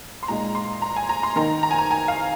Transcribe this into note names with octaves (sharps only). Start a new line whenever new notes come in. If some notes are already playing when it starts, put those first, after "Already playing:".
C6
A#2 G#3 D#4 A#5
C6
A#5
G#5
A#5
C6
D#3 A#3 D#4 A#5
A#5
G#5
A#5
G#5
F5